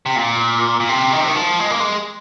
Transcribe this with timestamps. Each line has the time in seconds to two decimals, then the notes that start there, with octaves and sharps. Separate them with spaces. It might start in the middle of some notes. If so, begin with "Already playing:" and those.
0.06 C3
0.16 A#2
0.80 A#2
0.89 C3
1.12 D#3
1.20 C3
1.28 D#3
1.36 F3
1.60 G#3
1.71 A#3
1.80 G#3